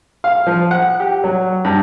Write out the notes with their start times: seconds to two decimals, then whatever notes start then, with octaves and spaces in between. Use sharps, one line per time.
0.24 F5
0.47 F3
0.71 F#5
1.00 G4
1.24 F#3
1.65 G2